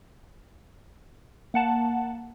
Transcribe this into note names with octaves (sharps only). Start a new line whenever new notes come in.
A#3 F#5 A5